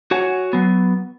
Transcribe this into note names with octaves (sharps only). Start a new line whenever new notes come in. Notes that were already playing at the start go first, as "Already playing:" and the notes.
F#4 C#5 F#5 G#5
F#3 B3